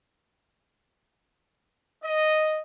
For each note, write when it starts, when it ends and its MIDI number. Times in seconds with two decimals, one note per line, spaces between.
2.04 2.61 75